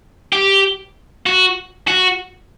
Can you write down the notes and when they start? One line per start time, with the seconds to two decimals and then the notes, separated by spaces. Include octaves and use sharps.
0.33 G4
1.27 F#4
1.88 F#4